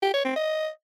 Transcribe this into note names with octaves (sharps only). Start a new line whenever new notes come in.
G4
C#5
C4
D#5